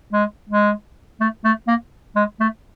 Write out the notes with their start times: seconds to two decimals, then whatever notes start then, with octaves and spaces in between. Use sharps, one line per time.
0.13 G#3
0.49 G#3
1.20 A3
1.45 A3
1.67 A#3
2.16 G#3
2.40 A3